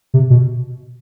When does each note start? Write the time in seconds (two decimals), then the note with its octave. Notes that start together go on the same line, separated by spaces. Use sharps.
0.14 C3
0.30 B2